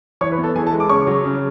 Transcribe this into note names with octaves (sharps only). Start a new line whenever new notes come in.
E3 C#5 C#6
B4 B5
B3
A4 A5
E3 G#4 G#5
A4 A5
G#3
D6
C#3 C#5 C#6
F#3
C#3